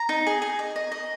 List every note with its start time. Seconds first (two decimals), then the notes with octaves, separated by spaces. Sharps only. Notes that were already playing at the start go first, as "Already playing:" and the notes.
Already playing: A#5
0.09 D#4
0.27 G#4
0.42 G#4
0.59 D#5
0.76 D#5
0.92 D#5